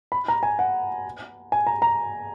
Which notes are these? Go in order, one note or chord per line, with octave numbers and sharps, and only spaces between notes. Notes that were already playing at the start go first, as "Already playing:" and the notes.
B5
A#5
G#5
F#5
G#5
A#5
A#5